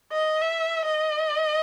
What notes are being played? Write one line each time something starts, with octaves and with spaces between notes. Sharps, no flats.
D#5
E5
D#5